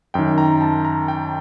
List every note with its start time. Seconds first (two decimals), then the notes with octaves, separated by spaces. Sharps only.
0.14 F#2 D#3 G5
0.38 A#5
0.61 A5
0.85 A#5
1.08 G5